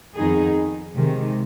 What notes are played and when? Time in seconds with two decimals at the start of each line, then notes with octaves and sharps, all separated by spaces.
0.16 F2 D#3 B3 D#4 G#4
0.95 C3 D#3 G#3